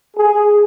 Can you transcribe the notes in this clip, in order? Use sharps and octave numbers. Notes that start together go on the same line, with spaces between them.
G#4